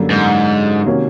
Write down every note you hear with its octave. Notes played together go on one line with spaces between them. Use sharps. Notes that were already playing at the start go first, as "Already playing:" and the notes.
Already playing: F#2 D3 G3 A#3
G#2
C3 D#3 F#3 A#3 C#4